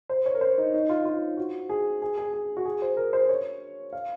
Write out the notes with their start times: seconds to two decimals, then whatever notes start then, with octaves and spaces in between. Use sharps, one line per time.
0.09 C5
0.26 C#5
0.34 A#4
0.41 C5
0.58 D#4
0.74 D#4
0.89 F4
1.05 F4
1.37 F#4
1.69 G#4
2.02 G#4
2.18 G#4
2.33 G#4
2.57 F#4
2.65 G#4
2.82 C5
2.97 A#4
3.13 C5
3.29 C#5
3.93 F5